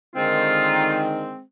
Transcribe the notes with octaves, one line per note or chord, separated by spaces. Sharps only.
D3 D#3 G#3 C4 F4